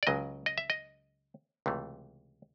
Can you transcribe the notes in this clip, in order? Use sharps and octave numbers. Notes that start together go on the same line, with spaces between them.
D5
C#2 C#3 F#3 D#5
D#5
E5
D#5
C#2 C3 E3 A3